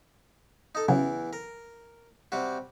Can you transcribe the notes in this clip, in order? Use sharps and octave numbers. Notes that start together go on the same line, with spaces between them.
D#4 A4
E2 C#3 E3 F#3
A#4
C3 G3 F#4